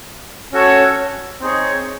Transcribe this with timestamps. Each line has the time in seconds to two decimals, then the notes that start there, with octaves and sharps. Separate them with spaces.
0.52 C#4 F#4 A4 C#5
1.41 C4 D#4 G#4 C#5